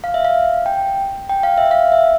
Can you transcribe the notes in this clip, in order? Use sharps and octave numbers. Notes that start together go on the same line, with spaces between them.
F5
E5
F5
G5
G5
F5
E5
F5
E5